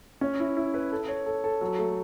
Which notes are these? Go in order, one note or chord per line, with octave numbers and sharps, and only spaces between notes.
C#4
E4
E4
B4
A4
C#5
A4
A4
F#3
A3